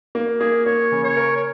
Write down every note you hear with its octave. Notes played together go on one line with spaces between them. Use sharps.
A#3
A#3 G#4
A#3 C#5
C#3
C#5
A#4
C#5